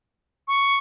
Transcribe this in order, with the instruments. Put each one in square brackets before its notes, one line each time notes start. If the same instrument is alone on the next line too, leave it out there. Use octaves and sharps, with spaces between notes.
[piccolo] C#6